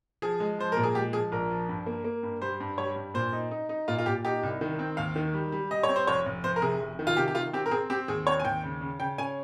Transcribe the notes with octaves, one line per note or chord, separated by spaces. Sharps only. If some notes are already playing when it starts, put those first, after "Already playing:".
F3 G#4
G#3
F3 C5
A#2 A#4
G#4
G#3 G4
F3 G#4
A#1 A#4
F3
G2
A#3
A#3
G2
G3 C5
G2
G3 C#5
G2
A#2 C5
D#4
D#4
D#4
A#2 F4
F4
A#2 G4
D#4 G4
C2
D#3
C4
D#2 F5
D#3
G3
G3
G3 D#5
C#5
C4
C5
F1 C#5
F1
F1 C5
A#4
C3 G#4
F1
D#3
F4
C3 G4
G4
D#3 F4
C4 G4
A#4
C4 G#4
C4 G4
D#2 G#4
C4 C#5
G#5
D#2 G5
C#3
C#3
C#3 G5
C#4 G#5